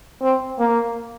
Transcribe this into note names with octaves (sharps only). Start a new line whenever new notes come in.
C4
A#3